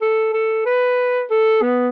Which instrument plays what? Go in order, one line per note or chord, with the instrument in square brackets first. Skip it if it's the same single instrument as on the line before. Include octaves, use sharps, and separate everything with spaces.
[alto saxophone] A4
A4
B4
A4
B3